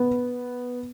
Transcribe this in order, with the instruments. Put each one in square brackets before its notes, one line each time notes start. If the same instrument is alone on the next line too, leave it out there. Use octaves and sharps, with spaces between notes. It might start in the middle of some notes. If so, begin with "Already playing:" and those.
Already playing: [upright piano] B3